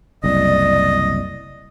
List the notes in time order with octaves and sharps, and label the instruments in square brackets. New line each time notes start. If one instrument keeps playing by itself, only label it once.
[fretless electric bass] F#1 C2 [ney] D5 [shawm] D#5